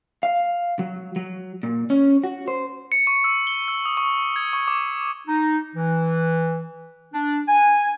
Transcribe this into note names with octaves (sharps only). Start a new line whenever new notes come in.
F5
F#3
F#3
A#2
C#4
F#4
C5
C#7
C#6
E6
G7
E6
D#6
C#6
G#6
C#6
D6
D#4
E3
D4
G#5